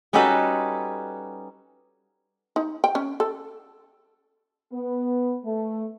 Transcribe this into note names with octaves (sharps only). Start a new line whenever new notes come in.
G3 C#4 D#4 F#4 A4 B4
D#4
G5
C#4
A4
B3
A3